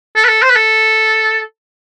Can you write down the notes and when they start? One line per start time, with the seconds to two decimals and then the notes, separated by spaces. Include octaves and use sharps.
0.16 A4
0.24 B4
0.28 A4
0.43 C5
0.50 B4
0.56 A4